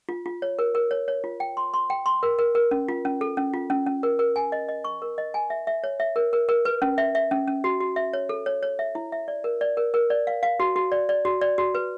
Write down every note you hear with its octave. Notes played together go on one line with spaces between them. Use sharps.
F4
F4
C#5
A#4
A#4
C#5
C#5
F4
G5
C6
C6
G5
C6
A#4
A#4
A#4
C#4
F4
C#4
A4
C#4
F4
C#4
C#4
A#4
A#4
G#5
D#5
D#5
C#6
A#4
D#5
G#5
E5
E5
C#5
E5
A#4
A#4
A#4
B4
C#4
E5
E5
C#4
C#4
F#4
F#4
E5
C#5
A4
C#5
C#5
E5
E4
E5
D5
A#4
D5
A#4
A#4
D5
F5
F5
F#4
F#4
D5
D5
F#4
D5
F#4
B4